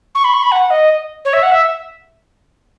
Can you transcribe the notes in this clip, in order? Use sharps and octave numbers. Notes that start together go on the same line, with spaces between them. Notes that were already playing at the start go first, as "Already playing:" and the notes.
C#6
B5
C#6
B5
F#5
D#5
C#5
E5
F#5
E5